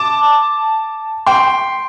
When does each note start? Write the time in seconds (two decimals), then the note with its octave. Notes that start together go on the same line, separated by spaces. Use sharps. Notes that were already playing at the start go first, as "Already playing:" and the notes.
Already playing: A5 D6
1.26 G5 C6